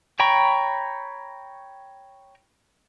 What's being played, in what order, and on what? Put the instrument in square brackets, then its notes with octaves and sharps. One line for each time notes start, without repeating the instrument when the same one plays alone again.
[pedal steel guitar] C#5 G5 A#5 B5 C#6